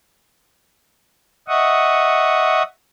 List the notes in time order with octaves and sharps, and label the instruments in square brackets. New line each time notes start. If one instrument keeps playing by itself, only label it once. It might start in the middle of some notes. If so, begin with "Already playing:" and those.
[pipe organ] D#5 E5 F#5 C#6 D#6